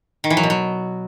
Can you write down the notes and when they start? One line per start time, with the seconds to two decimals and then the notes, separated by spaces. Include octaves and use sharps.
0.24 D#3
0.30 E3
0.37 F#3
0.43 B2
0.50 F#3